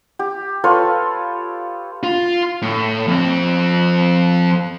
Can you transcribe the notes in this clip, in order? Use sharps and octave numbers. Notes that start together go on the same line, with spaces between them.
G4
F4 A4 B4 C#5
F4
A2
F2 C4